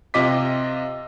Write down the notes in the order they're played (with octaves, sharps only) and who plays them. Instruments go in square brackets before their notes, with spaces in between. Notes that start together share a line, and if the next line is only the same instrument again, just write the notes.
[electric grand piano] C3 F4 D#5 D6 B6